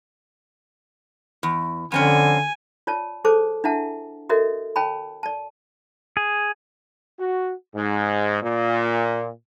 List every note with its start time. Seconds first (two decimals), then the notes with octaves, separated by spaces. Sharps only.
1.43 E2
1.92 F2 D3 C4 C#4 G#5
2.87 F4 C#5 D5 A5
3.25 G#4 A4 C5 C#5 A5 D6
3.64 D4 E4 E5 F#5 A5
4.29 F#4 A4 A#4 C#5 D#5 E5
4.76 C#5 G5 A5 B5
5.23 D5 A5
6.17 G#4
7.19 F#4
7.76 G#2
8.43 A#2